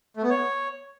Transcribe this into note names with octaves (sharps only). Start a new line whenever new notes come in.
A3
B3
C#5